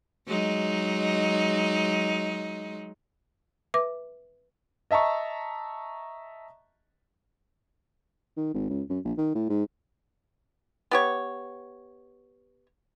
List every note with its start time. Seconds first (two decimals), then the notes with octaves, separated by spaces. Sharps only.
0.27 F#3 G#3 D#4
3.74 B4 E5 D6
4.91 D#5 E5 A5 A#5 C#6
8.37 D#3
8.54 G#1
8.70 C#2
8.90 F#2
9.05 A#1
9.18 D#3
9.35 A2
9.50 G#2
10.91 B3 G4 C#5